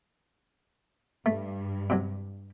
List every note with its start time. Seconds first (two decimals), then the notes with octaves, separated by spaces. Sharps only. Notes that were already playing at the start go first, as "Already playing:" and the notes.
1.26 G2 A3
1.90 C3 F#3